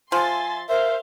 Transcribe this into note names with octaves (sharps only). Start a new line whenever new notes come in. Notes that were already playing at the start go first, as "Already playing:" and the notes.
F3 E5 G#5 C6 A6
A#4 C5 E5 F5